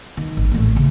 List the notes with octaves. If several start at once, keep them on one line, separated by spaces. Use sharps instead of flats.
D#3
G#1
A1 A3
C#3